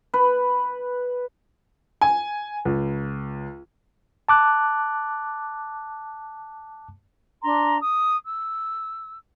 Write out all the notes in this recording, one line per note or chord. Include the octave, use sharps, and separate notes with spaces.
B4
G#5
C#2
A5 D6 F#6
D4 A#5 C6
D#6
E6